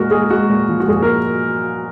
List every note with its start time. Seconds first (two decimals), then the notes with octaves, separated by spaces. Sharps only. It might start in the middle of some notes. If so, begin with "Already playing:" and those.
Already playing: A#2 G#3 F#4 A#4
0.11 G#3 G#4
0.30 G#3 F#4
0.50 A#2
0.69 F3
0.80 F#4
0.88 A#2 G#4
1.02 A#4